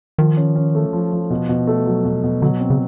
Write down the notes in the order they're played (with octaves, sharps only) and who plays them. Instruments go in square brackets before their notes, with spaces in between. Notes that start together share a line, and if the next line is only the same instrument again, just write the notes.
[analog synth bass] D#3 [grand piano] F3
[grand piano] C#4
C#4
A3
F3
F3
B2
B2
A3
F#3
B2
B2
[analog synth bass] D3 [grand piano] F#3
[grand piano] C4
[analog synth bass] C#3